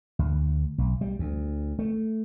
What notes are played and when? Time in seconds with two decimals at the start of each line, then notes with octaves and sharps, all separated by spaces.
0.19 D2
0.78 B1
1.01 G3
1.19 D2
1.79 A3